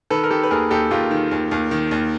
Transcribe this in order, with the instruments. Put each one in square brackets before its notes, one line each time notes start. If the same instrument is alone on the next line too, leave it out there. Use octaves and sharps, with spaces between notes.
[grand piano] D#3 A4 B4
A#4
D#3 G4 A4
B4
D#2 G#4 A#4
D#2 G4 A4
D#2 F4 G4
D#3
D#2
D#2
D#3
D#2